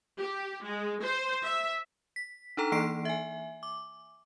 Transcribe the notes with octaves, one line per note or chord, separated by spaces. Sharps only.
G4
G#3
C5
E5
B6
D4 D#4 A4 A#5
E3 A#3 C7 D7
E5 G#5
D6